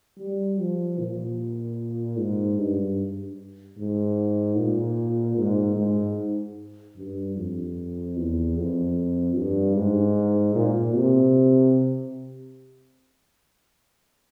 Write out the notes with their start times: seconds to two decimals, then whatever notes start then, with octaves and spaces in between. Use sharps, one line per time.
0.19 G3
0.59 F3
0.99 A#2
2.18 G#2
2.58 G2
3.78 G#2
4.57 A#2
5.37 G#2
5.77 G#2
6.96 G2
7.36 F2
8.16 E2
8.56 F2
9.36 G2
9.75 G#2
10.55 A#2
10.95 C3